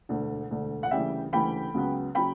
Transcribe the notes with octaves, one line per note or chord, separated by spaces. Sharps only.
E1 D2 D3
E1 D2 D3
F#5
D2 C#3 E3 G3 E5 G5
D2 C#3 E3 G3 G5 B5
C#2 C#3 F#3 B3
C#3 F#3 G5 B5